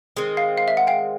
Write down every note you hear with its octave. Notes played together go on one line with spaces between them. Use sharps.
D#3 G#3 C4
F5
F5
E5
F#5
F5 G5